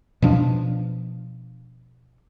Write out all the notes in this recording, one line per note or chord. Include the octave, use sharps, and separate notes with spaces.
B2 F3 D4